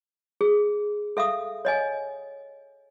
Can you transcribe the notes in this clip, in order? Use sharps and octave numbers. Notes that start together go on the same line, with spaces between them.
G#4
A4 E5 F5 D#6
C#5 D#5 G#5